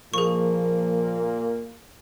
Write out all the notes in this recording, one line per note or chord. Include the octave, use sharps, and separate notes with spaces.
A#2 F3 A#3 G#4 C#6